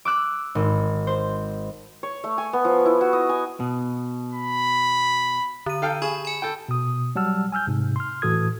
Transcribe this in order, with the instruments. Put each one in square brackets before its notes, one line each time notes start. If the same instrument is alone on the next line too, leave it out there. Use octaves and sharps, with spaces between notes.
[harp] D6 E6 F#6
G#1
C5
[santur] C#5
A3
G#5
B3
F3
E4
F#4
D#5
G#5
[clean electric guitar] B2
[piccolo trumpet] B5
[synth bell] D3 D#7
[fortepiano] A4 F5 G5
[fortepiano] G#4 [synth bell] B5 C#6
[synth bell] G#5 B5
[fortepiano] A4 G5
[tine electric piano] B2 D#6
F#3 G3 F#5 A5 E6 F6
G#5 E6 F6 G6
G#2 C3
C6 F6
A2 E3 F#4 A4 D#6 G#6